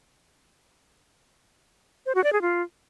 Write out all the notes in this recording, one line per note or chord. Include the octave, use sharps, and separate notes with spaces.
C5
F#4
D5
G#4
F4